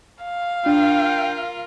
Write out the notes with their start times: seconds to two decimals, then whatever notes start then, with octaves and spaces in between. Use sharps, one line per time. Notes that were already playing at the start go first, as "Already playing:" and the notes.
0.24 F5
0.66 D4 F4 A#4 G5